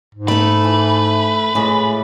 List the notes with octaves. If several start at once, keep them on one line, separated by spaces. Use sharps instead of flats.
G#2
A3 A4 B4
E3
A2 E3 G#3 F4